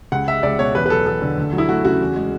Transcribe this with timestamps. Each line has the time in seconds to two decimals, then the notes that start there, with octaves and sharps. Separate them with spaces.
0.12 C#2 F#5
0.28 G#3 E5
0.43 C#2 D5
0.59 B2 C#5
0.74 E2 B4
0.86 B4
0.90 F#3 A4
1.06 E2 A4
1.22 D3
1.38 D2
1.53 F#3
1.58 E4
1.69 A3 F#4
1.85 C#3 F#4
2.00 E2
2.16 G#3